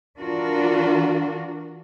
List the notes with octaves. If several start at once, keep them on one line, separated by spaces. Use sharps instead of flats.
E3 D4 F4 F#4 A#4